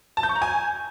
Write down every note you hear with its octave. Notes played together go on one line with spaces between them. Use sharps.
A5
G6
C#6
A#5
G#5